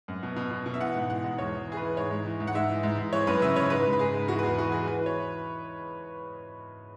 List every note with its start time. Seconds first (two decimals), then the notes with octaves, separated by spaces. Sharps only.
0.08 F#2
0.23 B2
0.36 B2
0.51 B2
0.66 B2
0.74 E5
0.81 E3 F#5
0.95 G#2
1.09 E3 F#5
1.24 G#2
1.38 E2 C#5
1.53 E3
1.68 E3 G#4
1.77 B4
1.82 E3
1.97 G#2 C#5
2.11 G#2
2.25 E3
2.40 G#2
2.47 F#5
2.55 G#2 E5
2.70 E3
2.83 G#2
2.98 G#2
3.13 E3 C#5
3.27 F#2 B4
3.42 C#3 E5
3.56 C#3 C#5
3.70 G#2 B4
3.86 G#2
3.93 B4
3.99 G#2 G#4
4.14 G#2
4.28 E3 F#4
4.39 B4
4.43 E2 G#4
4.58 E3 F#4
4.72 E3 G#4
4.86 E3 B4
5.01 E3
5.06 C#5